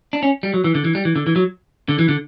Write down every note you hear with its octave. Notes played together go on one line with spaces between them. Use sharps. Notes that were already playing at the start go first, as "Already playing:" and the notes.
D4
C#4
G3
F#3
E3
D3
E3
G3
E3
D3
E3
F#3
D3
E3
D3